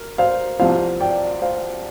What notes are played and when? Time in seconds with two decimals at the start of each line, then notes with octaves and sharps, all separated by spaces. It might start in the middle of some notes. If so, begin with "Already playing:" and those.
Already playing: A#4
0.18 C5 F5
0.60 C2 C3 F3 C5 F5
1.00 D5 G5
1.42 C5 F5